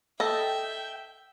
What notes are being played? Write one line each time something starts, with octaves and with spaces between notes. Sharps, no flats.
A4 D#5 E5 G5